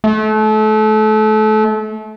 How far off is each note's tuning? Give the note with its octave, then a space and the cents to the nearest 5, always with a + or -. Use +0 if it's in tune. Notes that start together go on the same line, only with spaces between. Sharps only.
A3 -30